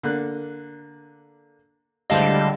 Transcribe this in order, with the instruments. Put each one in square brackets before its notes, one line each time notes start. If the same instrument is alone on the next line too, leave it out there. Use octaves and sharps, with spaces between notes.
[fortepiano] D3 A#3 F#6
[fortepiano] C#2 A2 C5 [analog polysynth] D3 G3 [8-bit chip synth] D#5 F5 A5